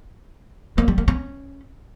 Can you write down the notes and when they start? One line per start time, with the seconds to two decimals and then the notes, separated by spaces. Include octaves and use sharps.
0.78 A#3
0.88 G3
0.98 A#3
1.08 C#4